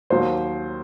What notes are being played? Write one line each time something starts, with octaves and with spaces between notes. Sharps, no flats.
D#2 D#3 F#3 C5